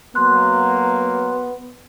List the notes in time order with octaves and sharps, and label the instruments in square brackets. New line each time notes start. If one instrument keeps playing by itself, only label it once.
[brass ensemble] F#3 A#3 [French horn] B3 [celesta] C6 F#6